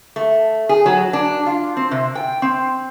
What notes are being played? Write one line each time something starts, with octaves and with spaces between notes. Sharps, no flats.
A3
G#4
F#3
D4
F4
C4
C3
G5
C4